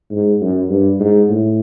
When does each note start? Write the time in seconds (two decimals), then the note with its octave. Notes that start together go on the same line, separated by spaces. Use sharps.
0.11 G#2
0.41 F#2
0.69 G2
1.00 G#2
1.29 A2